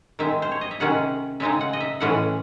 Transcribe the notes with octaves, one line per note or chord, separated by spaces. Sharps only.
D#3 G#3 C4 E5
C5
C#5
D#5
E5
C3 D#3 G#3 C#4 F#5
C#3 G#3 C4 D#4 E5
F#5
D#5
E5
A2 E3 G#3 C#4 F#5